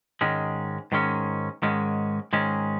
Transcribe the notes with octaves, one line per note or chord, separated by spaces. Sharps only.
G#2 D#3 G#3 C#4
G#2 D#3 G#3 C#4
G#2 D#3 G#3 C#4
G#2 D#3 G#3 C#4